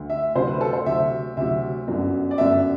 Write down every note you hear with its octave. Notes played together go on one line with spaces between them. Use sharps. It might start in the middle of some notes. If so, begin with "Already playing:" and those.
Already playing: D2
E5
D2 C3 F#3 C5
B4
A4
C5
D2 C3 F#3 E5
D2 C3 F#3 E5
G1 F#2 F#3
D5
G1 F#2 F#3 E5